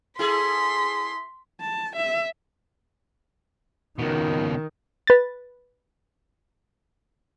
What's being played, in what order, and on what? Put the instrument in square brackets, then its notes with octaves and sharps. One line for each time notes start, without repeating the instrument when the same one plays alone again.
[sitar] E4 G#4 A4 [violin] C6 B6
[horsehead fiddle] A5
E5
[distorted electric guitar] C#2 B2 [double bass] D#3
[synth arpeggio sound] B4 A6